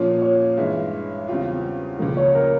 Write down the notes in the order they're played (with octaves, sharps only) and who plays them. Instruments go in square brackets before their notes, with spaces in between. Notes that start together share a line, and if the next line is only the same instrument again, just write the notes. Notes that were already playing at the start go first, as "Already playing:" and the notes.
Already playing: [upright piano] A#2 F3 A#3 C#4 F4 [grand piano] C#5
[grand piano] C#5
[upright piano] G2 E3 G#3 E4
E2 C#3 G3 C4 F4
C#2 C#3 F3 A#3
[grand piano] C#5
A#4